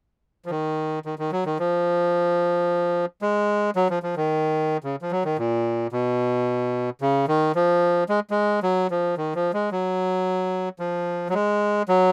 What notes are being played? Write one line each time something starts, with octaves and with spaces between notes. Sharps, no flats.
F3
D#3
D#3
D#3
F#3
D#3
F3
G#3
F#3
F3
F3
D#3
C#3
F3
F#3
D#3
A#2
B2
C#3
D#3
F3
G#3
G#3
F#3
F3
D#3
F3
G#3
F#3
F3
F#3
G#3
F#3